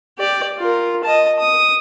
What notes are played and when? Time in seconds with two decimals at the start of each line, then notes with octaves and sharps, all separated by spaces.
0.18 G4 D5
0.58 F4 A#4
1.04 D#5 A5
1.39 D#6